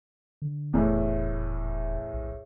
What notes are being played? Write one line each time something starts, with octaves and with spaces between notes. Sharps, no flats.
D3
D#1 E2 A2
A#1